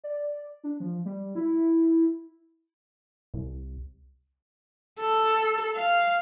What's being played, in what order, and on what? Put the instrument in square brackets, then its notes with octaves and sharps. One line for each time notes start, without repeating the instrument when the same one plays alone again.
[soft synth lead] D5
D4
F3
G3
E4
[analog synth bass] C2
[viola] A4
F5